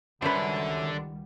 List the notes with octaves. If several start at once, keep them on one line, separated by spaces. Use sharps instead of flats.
C#2 F#2 D3 D#3 G3 D4 B4 C5